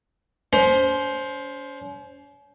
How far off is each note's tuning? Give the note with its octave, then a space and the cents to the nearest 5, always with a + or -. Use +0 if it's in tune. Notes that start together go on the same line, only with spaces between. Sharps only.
C#4 +40 C5 +5